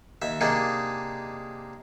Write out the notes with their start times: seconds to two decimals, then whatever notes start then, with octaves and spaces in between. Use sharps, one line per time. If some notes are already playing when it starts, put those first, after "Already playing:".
0.22 D#2 E5
0.41 C3 A#3 D4 D#4 G#4